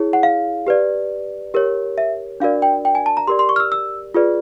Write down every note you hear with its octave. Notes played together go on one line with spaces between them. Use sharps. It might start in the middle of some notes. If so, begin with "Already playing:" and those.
Already playing: E4 G#4 C#5
F#5
F5
G4 B4 D5
G4 A#4 C#5
E5
D4 F#4 A#4 D5 F5
G5
G5
G#5
A5
A#5
G4 A#4 D5 C6
C6
C#6
F6
E6
E6
F4 G#4 B4 D5